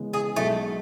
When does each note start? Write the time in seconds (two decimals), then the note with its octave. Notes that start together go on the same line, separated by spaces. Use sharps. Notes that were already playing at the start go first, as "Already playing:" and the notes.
Already playing: C#3 E3 G#3 B3
0.13 G#4
0.36 B1 B2 G#3 A3